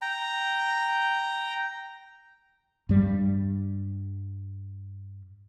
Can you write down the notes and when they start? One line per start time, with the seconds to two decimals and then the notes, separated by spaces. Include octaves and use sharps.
0.02 G5 A#5
2.89 G2 G3